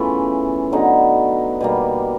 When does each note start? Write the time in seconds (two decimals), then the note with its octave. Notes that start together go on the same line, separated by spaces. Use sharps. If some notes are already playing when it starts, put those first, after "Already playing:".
Already playing: C#3 E3 A3 B3 C#4 F4
0.72 D3 F#3 B3 D#4
1.61 B2 G3 A#3